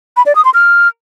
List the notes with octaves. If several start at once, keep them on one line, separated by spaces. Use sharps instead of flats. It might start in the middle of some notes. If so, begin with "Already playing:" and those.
B5
D5
D#6
C6
F6